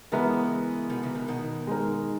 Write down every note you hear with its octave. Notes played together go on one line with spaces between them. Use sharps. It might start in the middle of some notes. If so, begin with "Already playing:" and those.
C#3 E3 G#3 B3 E4 A#4
B2 D#3
C#3 E3
B2 D#3
B2 D#3
G#3 D#4 A#4